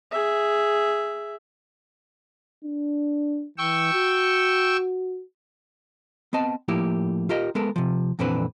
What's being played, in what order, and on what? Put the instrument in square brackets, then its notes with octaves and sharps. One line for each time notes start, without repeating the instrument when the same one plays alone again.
[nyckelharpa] G#4 E5
[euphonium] D4
[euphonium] E3 [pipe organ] G5 C#6 E6
[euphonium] F#4
[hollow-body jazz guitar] B3 C4 D#5 A5
A2 F3 A#3 E4 G4
F4 G4 A#4 D#5
G#3 B3 A4 A#4
C3 F3
F2 A#2 D3 E3 C4 B4